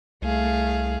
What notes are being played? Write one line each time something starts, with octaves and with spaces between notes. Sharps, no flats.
C2 A3 G#4 F5